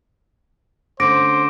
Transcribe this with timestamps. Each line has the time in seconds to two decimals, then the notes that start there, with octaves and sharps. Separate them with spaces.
1.00 D3 A3 C#4 C5 D6 A#6 D7